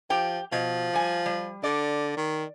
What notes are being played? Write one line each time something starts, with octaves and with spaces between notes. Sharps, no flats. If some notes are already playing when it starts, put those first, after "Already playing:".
F3 G4 G5
B2 F3
G3 G#5
G3
D3 D5
D#3